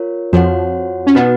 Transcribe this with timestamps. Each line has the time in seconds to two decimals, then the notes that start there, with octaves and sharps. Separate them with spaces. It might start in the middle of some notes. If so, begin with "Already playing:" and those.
Already playing: F4 A#4 C#5
0.33 F2 F3 F#4 C#5 F#5
1.07 C#4
1.15 B2 B3 D#4 F#4 B4 F#5